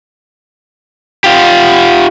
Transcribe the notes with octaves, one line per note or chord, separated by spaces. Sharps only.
F4 G4